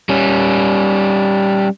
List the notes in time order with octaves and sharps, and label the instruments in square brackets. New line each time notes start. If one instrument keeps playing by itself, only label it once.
[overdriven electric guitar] G3 C#4